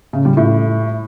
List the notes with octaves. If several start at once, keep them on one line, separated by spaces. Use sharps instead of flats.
C#3
G3
A2